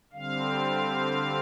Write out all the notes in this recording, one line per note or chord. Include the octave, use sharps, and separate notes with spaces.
D3 G3 C4 F5